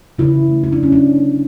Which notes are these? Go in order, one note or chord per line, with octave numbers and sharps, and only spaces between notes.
C#3 E4
A3
E4
D4
F#3 C#4
D4
C#3